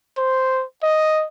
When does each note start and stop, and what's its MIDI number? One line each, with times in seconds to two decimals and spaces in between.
0.18 0.64 72
0.83 1.26 75